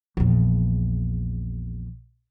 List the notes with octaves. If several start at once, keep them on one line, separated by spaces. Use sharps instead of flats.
A#1 E2